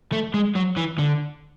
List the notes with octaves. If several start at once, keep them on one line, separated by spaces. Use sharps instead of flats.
A3
G#3
F#3
E3
D3